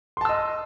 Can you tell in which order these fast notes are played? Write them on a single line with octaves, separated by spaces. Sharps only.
C6 A5 E6 D#5